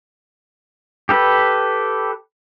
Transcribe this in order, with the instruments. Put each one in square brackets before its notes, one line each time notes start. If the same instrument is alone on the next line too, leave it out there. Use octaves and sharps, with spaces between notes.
[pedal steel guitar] G4 A4 B4